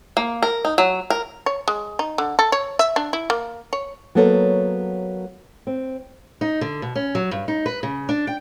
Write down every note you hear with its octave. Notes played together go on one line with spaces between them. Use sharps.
A#3
A#4
D#4
F#3
A#4
C#5
G#3
D#4
D3
A4
C#5
E5
D4
E4
A#3
C#5
F#3 A#3 B3 A4 C#5
C4
D#4
D3
B2
C#4
F#3
G2
D#4
B4
C#3
D4
G5